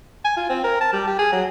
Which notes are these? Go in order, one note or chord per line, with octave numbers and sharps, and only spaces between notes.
G#5
F4
C4
A#4
A5
G3
G4
G#4
F#3